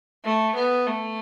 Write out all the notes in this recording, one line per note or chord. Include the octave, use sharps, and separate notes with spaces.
A3
B3
A3